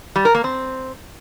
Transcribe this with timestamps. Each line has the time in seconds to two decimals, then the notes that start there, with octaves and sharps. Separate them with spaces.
0.16 G3
0.25 A#4
0.35 A#3
0.44 C4